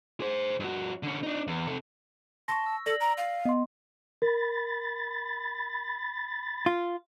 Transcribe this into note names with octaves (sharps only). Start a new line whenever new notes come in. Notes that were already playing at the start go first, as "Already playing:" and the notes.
G#4 C5
G2 F#4
D3 C#4
D4 D#4
E2
C3 A4
A5 C6 C#6 A#6
E6
A4 D5 A#6 F#7
A#5
F5
B3 D#5 C6
A#4 B5 A6
F4